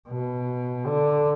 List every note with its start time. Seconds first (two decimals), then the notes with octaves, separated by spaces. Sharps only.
0.09 B2
0.86 D3